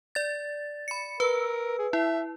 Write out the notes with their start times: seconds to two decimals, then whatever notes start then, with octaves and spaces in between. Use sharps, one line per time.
0.15 D5 A6
0.88 B5 C#7
1.20 A#4 B4 E6
1.79 G#4
1.93 E4 E5